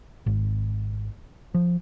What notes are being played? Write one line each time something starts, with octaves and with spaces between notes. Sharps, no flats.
G#1
F3